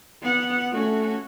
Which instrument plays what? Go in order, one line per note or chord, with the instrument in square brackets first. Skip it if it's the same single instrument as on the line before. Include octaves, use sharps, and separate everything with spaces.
[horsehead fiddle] B3 F#5
[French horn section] A3 [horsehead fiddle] C#4 F#4